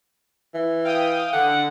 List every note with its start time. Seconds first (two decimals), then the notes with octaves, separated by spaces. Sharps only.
0.54 E3
0.84 F5 G5 D#6
1.33 D3 F#5